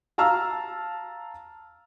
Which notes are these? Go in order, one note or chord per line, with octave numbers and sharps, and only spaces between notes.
F5 A5 A#5 E6 F6